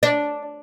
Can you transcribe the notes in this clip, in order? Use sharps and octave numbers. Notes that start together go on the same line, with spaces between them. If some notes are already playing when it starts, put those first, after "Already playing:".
D4